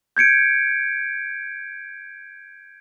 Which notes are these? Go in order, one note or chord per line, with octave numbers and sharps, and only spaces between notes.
G6 G#6 C#7 D7